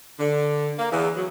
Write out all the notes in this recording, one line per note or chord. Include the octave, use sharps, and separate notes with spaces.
D3
A#3
E2
F#3